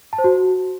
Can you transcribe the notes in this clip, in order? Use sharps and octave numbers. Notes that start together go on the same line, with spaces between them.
A5
C5
F#4